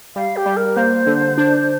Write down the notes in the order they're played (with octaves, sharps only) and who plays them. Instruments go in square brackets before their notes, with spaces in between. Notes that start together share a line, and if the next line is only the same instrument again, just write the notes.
[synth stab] G3 [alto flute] F5
[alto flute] G4
[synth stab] G3
[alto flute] A#4
[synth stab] A#3 [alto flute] C5
[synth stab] D3
D4